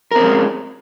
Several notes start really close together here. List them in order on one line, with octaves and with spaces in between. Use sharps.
A#4 C4 C#4 G#3